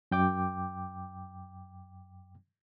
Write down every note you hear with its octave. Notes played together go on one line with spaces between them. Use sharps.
F#2 G5 D6